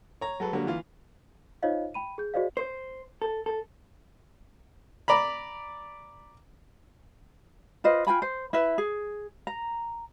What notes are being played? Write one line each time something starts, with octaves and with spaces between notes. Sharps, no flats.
C#5 A#5
F#3 G#3 A4 B4
D3 F#3 G3 A#3
E3 F4
D#4 F4 C5 C#5 D#5 F5
G5 B5 D#7
G#4 G6
F#4 G#4 C5 D5 D#5 F5
C5
A4
A4
D5 A#5 B5
F4 B4 C5 D#5
F4 G5 G#5 B5
C5
E4 B4 E5
G#4
A#5